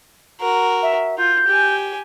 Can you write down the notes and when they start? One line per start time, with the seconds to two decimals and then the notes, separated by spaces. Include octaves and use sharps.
0.40 F#4 A#4
0.82 E5
1.18 F4 G6
1.47 G4 G#5